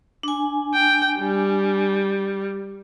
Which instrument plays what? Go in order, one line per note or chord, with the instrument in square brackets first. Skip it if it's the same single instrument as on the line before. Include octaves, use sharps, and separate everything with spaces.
[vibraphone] D4 G#5
[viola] G5
G3